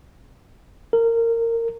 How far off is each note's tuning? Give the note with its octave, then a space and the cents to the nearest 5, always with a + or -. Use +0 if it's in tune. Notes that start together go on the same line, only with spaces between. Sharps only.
A#4 -20